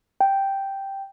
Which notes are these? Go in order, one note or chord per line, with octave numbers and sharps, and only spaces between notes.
G5